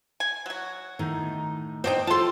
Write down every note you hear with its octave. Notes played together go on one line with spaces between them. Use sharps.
G#5
F#3 F#4
A2 D#3 D#4
C4 D4 D#4 C5 G5
F4 A4 A5 C6